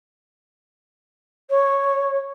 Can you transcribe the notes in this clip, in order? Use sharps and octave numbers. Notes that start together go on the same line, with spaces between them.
C#5